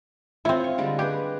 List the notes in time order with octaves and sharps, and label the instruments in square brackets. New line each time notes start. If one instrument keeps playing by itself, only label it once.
[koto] C4 E4 [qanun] F4 C#5
[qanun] C#6
D3 G3 G#3
[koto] G4 [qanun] G#4 B4